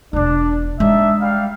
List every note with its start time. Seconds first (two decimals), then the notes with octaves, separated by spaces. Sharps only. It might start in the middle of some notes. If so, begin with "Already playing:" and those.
0.13 E1 D4 F4
0.80 G#3 D4 D#4 E5
1.21 G3 F5